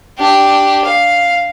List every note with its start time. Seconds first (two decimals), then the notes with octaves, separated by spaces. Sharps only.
0.19 D4 G4
0.85 F5